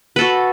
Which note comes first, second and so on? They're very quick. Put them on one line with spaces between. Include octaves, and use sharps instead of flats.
B4 A4 F#4